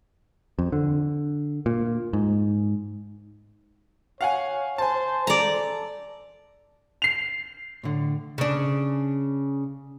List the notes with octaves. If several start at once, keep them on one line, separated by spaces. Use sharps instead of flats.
F2
D3
A#2
G#2
C#5 F5 F#5 G#5
C5 G#5 A5
A4 D5 A#5
C7 F7
A2 D3
C#3 D4